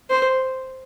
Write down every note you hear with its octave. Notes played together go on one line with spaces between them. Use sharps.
C5